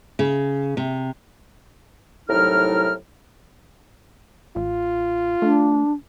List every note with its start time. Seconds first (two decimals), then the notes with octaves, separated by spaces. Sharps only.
0.19 C#3
0.77 C3
2.29 C2 A2 F#3 D#4 A#4 F6
4.56 A1 F4
5.42 A3 D4